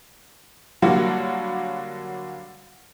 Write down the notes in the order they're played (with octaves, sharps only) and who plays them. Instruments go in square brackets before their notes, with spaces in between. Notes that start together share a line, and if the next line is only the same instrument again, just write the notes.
[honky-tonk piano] D3 F#3 G3 A#3 F#4